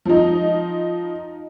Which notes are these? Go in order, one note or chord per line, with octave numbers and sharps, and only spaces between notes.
F3 D#4